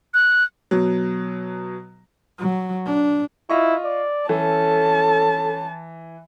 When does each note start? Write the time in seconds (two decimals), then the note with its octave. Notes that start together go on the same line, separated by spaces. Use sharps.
0.14 F#6
0.71 B2 F#3
2.39 F#3
2.86 D4
3.50 E4 F4 D#5 C#6
3.85 D5
4.29 E3 C#4 A4 A5